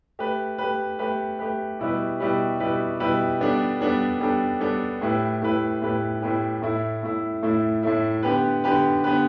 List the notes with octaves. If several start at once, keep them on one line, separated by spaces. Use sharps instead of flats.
A3 G4 B4
A3 G4 B4
A3 G4 B4
A3 G4 B4
B2 G3 E4 G4 B4
B2 G3 E4 G4 B4
B2 G3 E4 G4 B4
B2 G3 E4 G4 B4
G3 B3 D4 A4
G3 B3 D4 A4
G3 B3 D4 A4
G3 B3 D4 A4
A2 A3 E4 G4 B4
A2 A3 E4 G4 B4
A2 A3 E4 G4 B4
A2 A3 E4 G4 B4
A2 A3 E4
A2 A3 E4
A2 A3 E4
A2 A3 E4
D3 B3 G4 B4
D3 B3 G4 B4
D3 B3 G4 B4